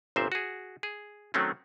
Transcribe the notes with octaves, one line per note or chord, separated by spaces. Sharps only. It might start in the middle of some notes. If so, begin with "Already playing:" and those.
G1 A#2 C4 C5 E5
F#4 G#4
G#4
D#3 F#3 A3 C4 C#4